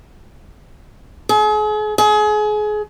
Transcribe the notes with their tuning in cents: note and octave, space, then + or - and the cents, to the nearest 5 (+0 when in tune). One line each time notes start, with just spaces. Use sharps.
G#4 +40
G#4 +30